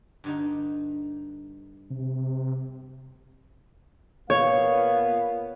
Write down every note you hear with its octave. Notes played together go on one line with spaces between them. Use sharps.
G2 D3 D#4
C3
A#2 B3 C#5 F5